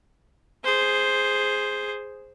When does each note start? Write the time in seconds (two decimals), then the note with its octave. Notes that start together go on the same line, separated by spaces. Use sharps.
0.64 G#4 C5